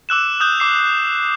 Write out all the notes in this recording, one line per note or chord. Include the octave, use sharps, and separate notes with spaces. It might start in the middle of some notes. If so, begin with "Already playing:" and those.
D6 E6 F#6 E7
D#6 F#6 G6
D6 C7